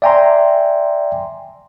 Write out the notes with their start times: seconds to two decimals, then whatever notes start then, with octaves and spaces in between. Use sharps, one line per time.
0.02 D5 E5 G5 G#5 A#5 C6